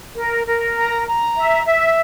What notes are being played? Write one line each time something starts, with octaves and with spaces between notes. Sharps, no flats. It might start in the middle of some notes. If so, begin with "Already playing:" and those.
A#4
A#4
A#5
A#5
E5
E5